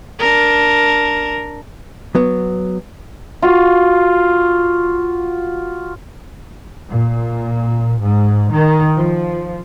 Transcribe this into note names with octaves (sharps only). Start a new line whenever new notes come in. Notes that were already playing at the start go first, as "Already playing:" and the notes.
D4 A#4
F#3 B3
F4 F#4
A#2
G#2
D#3
F3